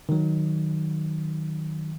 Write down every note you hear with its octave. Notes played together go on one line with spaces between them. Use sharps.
D#3 F#3